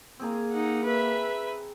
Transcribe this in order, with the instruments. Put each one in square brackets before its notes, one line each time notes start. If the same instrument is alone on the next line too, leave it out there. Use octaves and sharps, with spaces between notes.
[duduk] A#3 [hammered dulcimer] C4 G#4 A#5
[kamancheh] D#4 F#5
B4 E5